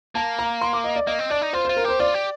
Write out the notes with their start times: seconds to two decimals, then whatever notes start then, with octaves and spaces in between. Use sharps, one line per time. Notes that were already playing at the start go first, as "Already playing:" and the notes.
0.15 A#3 A5
0.39 A#5
0.61 C6
0.73 D6
0.84 D#5
0.96 D5
1.07 A#3 D#5
1.19 C4
1.30 D4 D5
1.42 D#4
1.53 F4 C5
1.65 F4 C5
1.76 A#4
1.85 G4 C5
2.00 F4 D5
2.14 G4